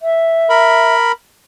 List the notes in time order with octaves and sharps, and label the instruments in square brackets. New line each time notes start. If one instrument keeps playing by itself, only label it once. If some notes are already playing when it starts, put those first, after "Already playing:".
[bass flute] E5
[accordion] A#4 B5